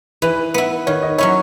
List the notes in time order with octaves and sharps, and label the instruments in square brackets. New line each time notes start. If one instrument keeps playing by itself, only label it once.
[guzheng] E3 [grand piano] B4
[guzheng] B3 E4
[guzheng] D#3 [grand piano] C#5
[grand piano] D#5
[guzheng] F#3 C#4 E4 [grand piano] C#5